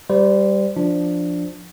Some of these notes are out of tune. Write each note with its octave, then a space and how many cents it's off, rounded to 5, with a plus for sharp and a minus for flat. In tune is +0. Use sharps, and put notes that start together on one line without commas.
G3 +0 C5 -25
F3 +0 D4 +0